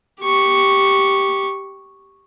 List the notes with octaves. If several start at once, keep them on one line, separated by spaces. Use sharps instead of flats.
G4 C#6